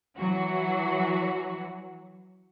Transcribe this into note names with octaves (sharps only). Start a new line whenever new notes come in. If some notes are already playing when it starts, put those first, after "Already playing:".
E3 F#3 F#4